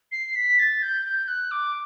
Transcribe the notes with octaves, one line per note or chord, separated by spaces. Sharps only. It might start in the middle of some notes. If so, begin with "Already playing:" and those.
C7
B6
A6
G6
G6
F#6
D6